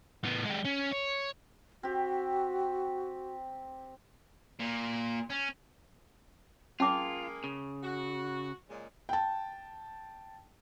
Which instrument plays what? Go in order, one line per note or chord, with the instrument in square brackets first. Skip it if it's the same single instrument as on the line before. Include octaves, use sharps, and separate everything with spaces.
[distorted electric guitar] A2 B3
G#3 G4
C#4
C#5
[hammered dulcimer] C4 G4 [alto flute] F#4
[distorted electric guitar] A#2
C#4
[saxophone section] G#3 A#3 G#4 [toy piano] C#4 A5 D6 [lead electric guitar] F4
[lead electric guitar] C#3
[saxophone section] F#4
A#2 C#3 G#3
[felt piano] G5 A5